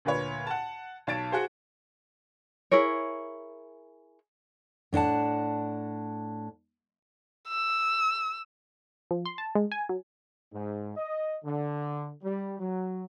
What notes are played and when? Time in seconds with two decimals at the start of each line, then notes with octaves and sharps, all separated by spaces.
0.05 D2 A#2 B4 C#5
0.47 F#5 A5
1.07 B1 C#5 A5 A6 D7
1.32 F#4 G#4 C5
2.71 E4 G#4 A#4 C#5
4.93 A2 D4 D5 F#5 A5
7.48 E6
9.11 F3
9.26 C6
9.38 A5
9.55 G#3
9.72 G#5
9.89 F#3
10.53 G#2
10.97 D#5
11.44 D3
12.23 G3
12.60 F#3